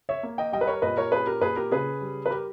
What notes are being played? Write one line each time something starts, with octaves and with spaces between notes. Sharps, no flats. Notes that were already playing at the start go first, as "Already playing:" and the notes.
C#5 E5
A#3
D#5 G5
G3 D#5 G5
B4
A#4 C#5
A#2 B4 D#5
A#4 C#5
C#4 G#4 B4
G4 A#4
A#2 G#4 B4
G4 A#4
C#3 G#4 B4
G3
B4
G4 A#4